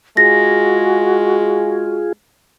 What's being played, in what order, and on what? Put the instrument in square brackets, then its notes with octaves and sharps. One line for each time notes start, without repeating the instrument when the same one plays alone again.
[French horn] G#3 [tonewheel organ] F4 G#4 [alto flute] F#4 [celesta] A#6